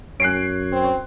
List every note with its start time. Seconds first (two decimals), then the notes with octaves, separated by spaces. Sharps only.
0.20 F#2 C#5 F#6 C7 D7
0.72 C4